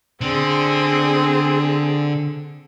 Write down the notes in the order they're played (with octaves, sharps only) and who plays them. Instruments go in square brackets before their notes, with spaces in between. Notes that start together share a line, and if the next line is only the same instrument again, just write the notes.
[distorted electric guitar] D3 [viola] C4 G#4